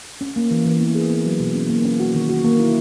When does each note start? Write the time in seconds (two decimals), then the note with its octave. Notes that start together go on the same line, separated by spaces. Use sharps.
0.21 C#4
0.36 A#3
0.51 E3
0.66 E3
0.80 B3
0.95 G#4
1.10 B3
1.25 F#3
1.40 B2
1.55 C#4
1.69 A#3
1.85 C#4
2.00 F#4
2.15 D#3
2.29 F#4
2.44 A#3
2.59 E4